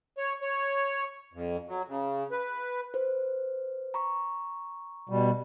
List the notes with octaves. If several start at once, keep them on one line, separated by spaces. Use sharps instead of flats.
C#5
C#5
F2
F#3
C#3
B4
B4 C5
A#5 B5 C#6
B2 G3